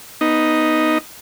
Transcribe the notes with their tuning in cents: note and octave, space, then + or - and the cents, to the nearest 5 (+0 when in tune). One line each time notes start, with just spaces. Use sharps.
B3 +0 D#4 +0